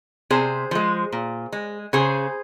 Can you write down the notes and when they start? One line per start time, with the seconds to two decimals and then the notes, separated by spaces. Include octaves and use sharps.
0.30 C3 G#4 C5
0.71 F3 G#3
1.12 A#2
1.52 G#3
1.93 C#3 G#4 C5